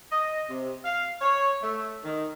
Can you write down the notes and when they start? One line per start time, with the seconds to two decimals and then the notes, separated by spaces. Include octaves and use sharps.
0.11 D#5
0.49 C3
0.85 F5
1.21 C#5
1.62 A3
2.04 D#3